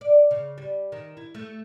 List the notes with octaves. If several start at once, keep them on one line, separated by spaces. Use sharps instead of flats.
D5
C#3
G3
D#3
E4
A3